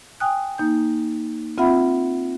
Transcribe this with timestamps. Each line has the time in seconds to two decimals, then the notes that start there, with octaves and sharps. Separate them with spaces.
0.20 G5 G#5 D#6 F#6
0.58 A#3 D#4 G6
1.58 C4 F4 E5 F#5 B5